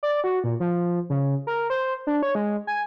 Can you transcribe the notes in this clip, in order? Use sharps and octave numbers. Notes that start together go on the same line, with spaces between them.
D5
F#4
A#2
F3
C#3
A#4
C5
D4
C#5
G#3
G#5